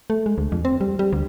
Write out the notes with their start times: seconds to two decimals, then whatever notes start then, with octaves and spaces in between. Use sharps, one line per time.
0.10 A3
0.26 G#3
0.38 D2
0.52 F2
0.65 C4
0.81 G3
0.99 G3
1.13 D2